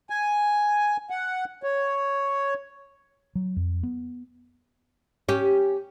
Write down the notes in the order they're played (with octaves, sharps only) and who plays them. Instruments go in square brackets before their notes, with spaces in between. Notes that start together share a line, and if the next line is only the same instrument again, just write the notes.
[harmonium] G#5
F#5
C#5
[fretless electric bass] F#3
F2
B3
[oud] C#4 G4